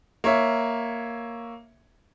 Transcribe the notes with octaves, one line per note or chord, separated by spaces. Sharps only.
A#3 C#5 E5